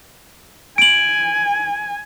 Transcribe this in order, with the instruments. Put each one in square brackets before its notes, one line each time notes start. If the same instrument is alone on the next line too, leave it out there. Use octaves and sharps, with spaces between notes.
[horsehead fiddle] G#5 [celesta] D7 F#7